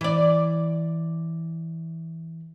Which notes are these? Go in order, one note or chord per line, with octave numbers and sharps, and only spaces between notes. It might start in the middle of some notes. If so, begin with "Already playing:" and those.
E3 D5